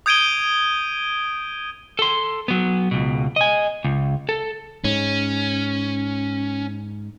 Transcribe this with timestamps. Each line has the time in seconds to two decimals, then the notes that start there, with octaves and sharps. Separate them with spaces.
0.06 D#6 G6 G#6 D7 D#7 G7
1.99 A4 C6
2.48 F#3 B3
2.91 C#2 B2
3.36 D#5 G#5
3.84 C#2
4.29 A4
4.84 G#2 C#4